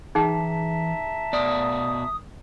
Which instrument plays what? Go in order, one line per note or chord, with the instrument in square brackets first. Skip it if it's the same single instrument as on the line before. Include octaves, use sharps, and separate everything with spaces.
[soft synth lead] E3 [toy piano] D#4 G#4 G5 [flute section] E5 A5 A#5
[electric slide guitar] B2 D5 [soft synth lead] D#6